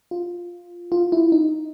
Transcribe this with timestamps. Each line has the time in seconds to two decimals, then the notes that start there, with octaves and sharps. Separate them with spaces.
0.11 F4
0.92 F4
1.12 E4
1.32 D#4